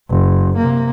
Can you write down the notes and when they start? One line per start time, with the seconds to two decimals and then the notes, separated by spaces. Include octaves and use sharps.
0.10 F#1
0.57 C3 A#3